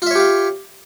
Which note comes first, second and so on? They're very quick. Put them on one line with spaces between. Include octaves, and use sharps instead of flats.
F4 E5 C#5 G4 F5